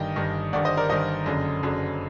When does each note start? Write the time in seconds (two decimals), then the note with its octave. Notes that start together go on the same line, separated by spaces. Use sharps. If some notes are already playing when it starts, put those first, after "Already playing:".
Already playing: G1 G2 D#3 D#5 G5
0.16 G1 G2 D#3
0.53 G1 G2 D#3 D5 F#5
0.65 C5 D#5
0.77 A#4 D5
0.89 G1 G2 D#3 C5 D#5
1.26 F#1 F#2 D3
1.63 F#1 F#2 D3